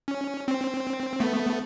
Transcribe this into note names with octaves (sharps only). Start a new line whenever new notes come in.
C#4
C4
A3 B3